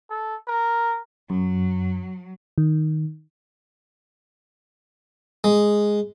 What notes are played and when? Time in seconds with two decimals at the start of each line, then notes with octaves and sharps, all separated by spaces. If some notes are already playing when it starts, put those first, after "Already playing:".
0.10 A4
0.47 A#4
1.30 F#2 F#3
2.58 D#3
5.44 G#3